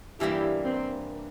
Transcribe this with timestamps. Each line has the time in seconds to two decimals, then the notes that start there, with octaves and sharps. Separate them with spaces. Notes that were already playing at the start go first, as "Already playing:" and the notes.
0.20 G2 E3 G3 A#3 E4 G4
0.64 C4